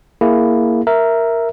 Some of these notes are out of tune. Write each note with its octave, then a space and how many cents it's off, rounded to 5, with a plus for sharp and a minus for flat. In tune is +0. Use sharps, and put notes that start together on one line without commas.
A#3 +0 E4 +0 G#4 +0
A#4 +0 E5 +0